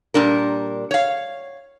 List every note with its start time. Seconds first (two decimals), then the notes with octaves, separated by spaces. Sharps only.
0.14 A#2 G3 D4 A#4
0.91 C#5 F5